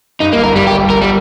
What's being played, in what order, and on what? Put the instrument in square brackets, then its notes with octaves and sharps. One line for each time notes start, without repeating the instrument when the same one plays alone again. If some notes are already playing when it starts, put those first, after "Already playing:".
[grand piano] G2 [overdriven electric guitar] D#4
[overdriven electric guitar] A#3
[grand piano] G1
[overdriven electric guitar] A#4
[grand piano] G2 [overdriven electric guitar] G3
[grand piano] G1 [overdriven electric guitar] G4
[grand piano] G1
[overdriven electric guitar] A#4
G3